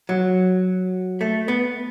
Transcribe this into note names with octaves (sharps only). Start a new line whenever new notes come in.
F#3
A3
B3